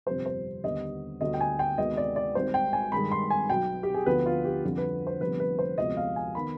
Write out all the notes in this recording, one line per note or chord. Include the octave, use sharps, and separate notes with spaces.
G1 F2 C3 G3 C5
C5
D#2 D3 G3 B3 D#5
D2 D3 G3 B3 D#5
G5
G#5
G5
D2 C3 D#3 G#3 B3 D#5
D5
D5
G#1 G#2 G3 C5
G5
G#5
G2 D#3 G#3 B5
C6
G#5
B1 B2 B3 G5
G4
G#4
D2 D3 F3 B3 B4
F4
G4
F2 D3 G3
B4
C5
F1 F2 D3 G3 B3 B4
B4
C5
D2 C3 F3 G#3 B3 D#5
F5
G#5
D#3 B3 B5